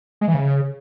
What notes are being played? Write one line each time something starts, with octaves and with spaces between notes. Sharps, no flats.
G#3
E3
C#3